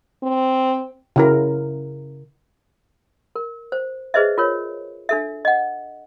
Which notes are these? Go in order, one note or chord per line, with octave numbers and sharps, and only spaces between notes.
C4
C#3 E4 A#4
A#4
C5
G#4 B4 C5 D#5 E5
F4 A#4 C#5
D4 A4 E5
D#5 F#5